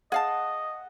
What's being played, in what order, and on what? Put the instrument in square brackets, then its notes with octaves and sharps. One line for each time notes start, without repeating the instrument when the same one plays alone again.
[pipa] G#4 F5 A5 [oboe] D#5 [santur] F#5